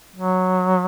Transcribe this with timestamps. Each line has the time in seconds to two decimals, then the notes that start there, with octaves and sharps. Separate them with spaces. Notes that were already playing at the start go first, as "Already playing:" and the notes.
0.16 F#3